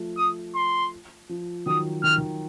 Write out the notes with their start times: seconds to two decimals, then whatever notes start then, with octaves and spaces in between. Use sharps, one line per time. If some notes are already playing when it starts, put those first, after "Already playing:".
Already playing: F3 A3
0.17 D#6
0.55 C6
1.29 F3
1.66 D#3 F#3 D#6
2.03 D#3 F6
2.18 D#3